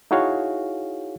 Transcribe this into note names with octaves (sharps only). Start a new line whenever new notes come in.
D#4 E4 F#4 G#4 C#5 F5